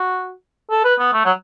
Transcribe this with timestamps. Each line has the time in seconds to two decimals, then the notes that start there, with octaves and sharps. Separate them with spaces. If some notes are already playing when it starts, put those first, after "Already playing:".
Already playing: F#4
0.70 A4
0.84 B4
0.99 B3
1.13 A3
1.25 F#3